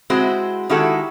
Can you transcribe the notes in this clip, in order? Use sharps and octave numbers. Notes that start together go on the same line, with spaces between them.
G#3 C4 E4 F#4 C5
D#3 G#3 E4 F#4 G4 A4